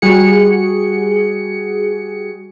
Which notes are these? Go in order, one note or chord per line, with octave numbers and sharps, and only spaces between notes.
G3 F#4 G#4 C#7